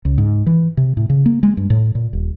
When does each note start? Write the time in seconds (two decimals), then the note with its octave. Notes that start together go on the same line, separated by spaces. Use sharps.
0.05 C#2
0.18 G#2
0.46 E3
0.77 C3
0.97 A2
1.10 C#3
1.26 A#3
1.43 G#3
1.57 G2
1.70 A2
1.95 A#2
2.13 D#1